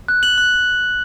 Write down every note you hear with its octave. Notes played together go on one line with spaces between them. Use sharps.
F#6
F#7
F#6